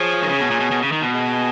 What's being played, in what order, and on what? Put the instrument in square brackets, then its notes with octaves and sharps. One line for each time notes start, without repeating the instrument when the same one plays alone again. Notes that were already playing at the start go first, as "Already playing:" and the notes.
Already playing: [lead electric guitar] F3 [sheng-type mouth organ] G#4 C#5 G#5
[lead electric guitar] D#3
C#3
B2
A#2
B2
B2
C#3
D#3
B2
[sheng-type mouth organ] G#4 D#5 G#5